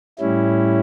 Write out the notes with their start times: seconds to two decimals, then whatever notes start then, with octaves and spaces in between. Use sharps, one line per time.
0.19 A2 G3 C#4 E4